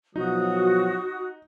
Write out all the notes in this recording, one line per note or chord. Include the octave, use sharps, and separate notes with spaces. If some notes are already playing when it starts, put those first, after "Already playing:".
B2 F3 F#3 D#4 F#4 D#6